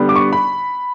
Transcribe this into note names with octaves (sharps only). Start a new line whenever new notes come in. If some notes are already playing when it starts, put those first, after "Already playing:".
Already playing: D3 G3 B3
D6
C#6
B5